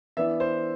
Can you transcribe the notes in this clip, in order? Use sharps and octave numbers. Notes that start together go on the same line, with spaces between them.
E3 B3 D4 E5
C5